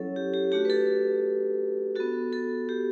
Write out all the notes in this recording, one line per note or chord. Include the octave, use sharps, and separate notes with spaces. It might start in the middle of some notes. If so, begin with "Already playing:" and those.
Already playing: F#3 C#4 E4 A4 C#5
G4
G4
A3 D4 F#4 G4
B4
A4
B3 F#4 A4
A4
G4